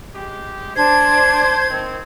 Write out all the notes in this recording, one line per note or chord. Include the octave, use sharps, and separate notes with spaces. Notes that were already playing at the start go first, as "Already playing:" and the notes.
G#3 G4
D4 C5 G#6
D#3 C4